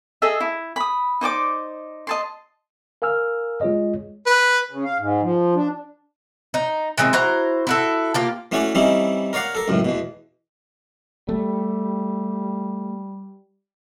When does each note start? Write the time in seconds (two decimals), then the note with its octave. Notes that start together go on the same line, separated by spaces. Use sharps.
0.22 G#4 A4 D#5 E5
0.40 E4
0.76 B5 D#6
1.21 D#4 C5 D5 D6
2.07 D#5 A5 C6
3.02 A#4 F5 G#5 E6 F6
3.61 G#3 F4 G#4 C#5 D#5
4.27 B4
4.71 C#3
4.84 F5
4.99 G#2
5.22 F3
5.55 D4
6.54 D#4
6.98 D#3 E3 G#3 C4
7.13 E4 F#4 C5 A#5
7.67 E4 F#4 A4
8.14 A#3 F4 G4
8.52 E3 A3 C#4 F#4 C#5 D5
8.75 E3 G3 C4 C#4 D#4 E4
9.33 A#4 C#5 D5 F5 F#5
9.55 A4 A#4
9.68 C#2 F#2 A2
9.85 E2 B2
11.29 G3 A3